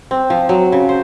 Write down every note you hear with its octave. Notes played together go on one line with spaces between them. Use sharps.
C4
F3
F#3
C#3
C5